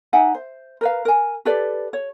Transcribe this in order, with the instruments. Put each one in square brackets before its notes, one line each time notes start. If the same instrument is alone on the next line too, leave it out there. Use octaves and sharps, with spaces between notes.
[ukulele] D#4 E5 F#5 G#5
C5
A#4 B4 F5
A#4 G#5
G4 A4 B4 D5
C#5